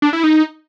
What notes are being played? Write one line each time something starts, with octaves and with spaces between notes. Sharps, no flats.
D4
E4
D#4